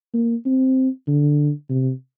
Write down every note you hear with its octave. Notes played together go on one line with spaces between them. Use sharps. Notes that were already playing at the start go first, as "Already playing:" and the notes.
A#3
C4
D3
C3